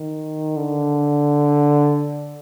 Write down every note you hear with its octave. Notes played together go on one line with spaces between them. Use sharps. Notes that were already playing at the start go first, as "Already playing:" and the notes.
Already playing: D#3
D3